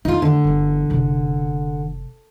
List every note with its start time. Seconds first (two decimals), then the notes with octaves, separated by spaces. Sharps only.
0.05 A3 D#4 F4
0.22 D3
0.44 G1 E3
0.90 F#1 C3